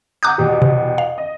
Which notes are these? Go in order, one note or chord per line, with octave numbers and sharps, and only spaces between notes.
F#5 A#5 D6 D#6 F#6 G6
E2 B2 G4
C3
F5
D#5